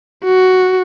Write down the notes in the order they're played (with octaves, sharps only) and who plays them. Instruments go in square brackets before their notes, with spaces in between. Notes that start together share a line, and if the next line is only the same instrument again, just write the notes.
[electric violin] F#4